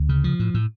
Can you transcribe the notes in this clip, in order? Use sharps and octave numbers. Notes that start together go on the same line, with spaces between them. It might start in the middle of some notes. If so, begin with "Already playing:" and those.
Already playing: D2
C#3
F3
A2
A2